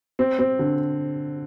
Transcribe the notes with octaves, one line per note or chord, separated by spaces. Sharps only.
C4
C4
D3